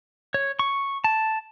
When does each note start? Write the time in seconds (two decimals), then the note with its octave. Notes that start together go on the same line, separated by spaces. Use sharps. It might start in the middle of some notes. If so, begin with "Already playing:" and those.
0.34 C#5
0.59 C#6
1.04 A5